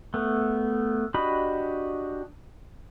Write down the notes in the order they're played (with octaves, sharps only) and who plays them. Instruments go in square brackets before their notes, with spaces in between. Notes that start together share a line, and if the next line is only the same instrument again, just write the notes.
[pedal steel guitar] A3 B3
D4 F#4 G4 D#5 B5